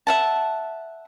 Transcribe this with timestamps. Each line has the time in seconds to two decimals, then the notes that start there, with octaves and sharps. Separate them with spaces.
0.07 E5 F#5 A5